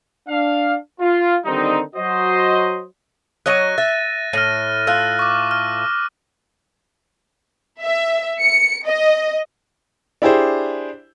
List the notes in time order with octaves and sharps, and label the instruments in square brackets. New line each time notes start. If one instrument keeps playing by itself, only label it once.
[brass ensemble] D4 F5
F4
D3 D#3 G3 C4 D#4
F#3 F#4 C5 D#5
[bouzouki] F#3 C#5 D#5 [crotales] F#6 A#6 D#7
[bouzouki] E5 [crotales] A6
[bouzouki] A2 [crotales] F6 A#6 D#7
[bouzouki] A2 F4 [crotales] E6 F#6
[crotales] C#6 D6
F6
[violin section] E5
C#7
D#5
[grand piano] D4 E4 G4 G#4 C5